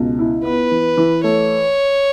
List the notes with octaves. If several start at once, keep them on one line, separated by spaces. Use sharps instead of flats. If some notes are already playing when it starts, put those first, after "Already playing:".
Already playing: C#2 B2
E4
B3 B4
E3
E3
A3 C#5